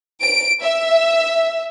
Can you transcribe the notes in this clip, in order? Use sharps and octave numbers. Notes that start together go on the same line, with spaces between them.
D7
E5